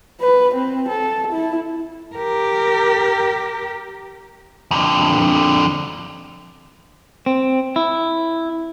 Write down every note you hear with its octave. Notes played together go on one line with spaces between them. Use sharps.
B4
C4
A4
E4
G4 A#4
F2 D3
C4
E4